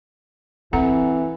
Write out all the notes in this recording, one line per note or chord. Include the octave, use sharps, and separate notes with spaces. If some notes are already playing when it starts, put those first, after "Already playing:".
E3 C4 A4 F#5 A#5